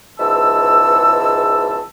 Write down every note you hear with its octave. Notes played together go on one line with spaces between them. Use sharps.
C#2 G#2 B2 E3 A5 E6